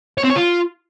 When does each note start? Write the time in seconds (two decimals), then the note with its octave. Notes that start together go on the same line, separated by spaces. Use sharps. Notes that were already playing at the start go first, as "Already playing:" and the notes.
0.18 C#5
0.24 C4
0.30 C#5
0.36 F4